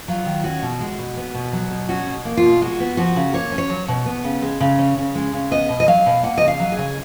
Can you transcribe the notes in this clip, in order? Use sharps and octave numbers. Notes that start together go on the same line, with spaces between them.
F#3 F4
D#3
C#4 F#4
B2
G#3
B2
B3
B2
F#3
B2
C#4 F#4
B2
A#3
F4
B2
G#3 F#4
B3
F3 F#4
C#3
A#3 C#5
C#4
C#5
F#3
B2
B3
C#3
G#3
C#3
C#4
C#3
G#3
C#3
B3 D#5
B2
D#5
F#3 F5
B2
A#3 F#5
C#3 D#5
F5
F#3
G#4
C#3